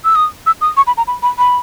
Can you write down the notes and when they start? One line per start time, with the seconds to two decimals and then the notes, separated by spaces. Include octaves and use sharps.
0.05 E6
0.15 D#6
0.46 E6
0.61 D#6
0.77 C#6
0.87 B5
0.97 A#5
1.07 B5
1.23 B5
1.38 B5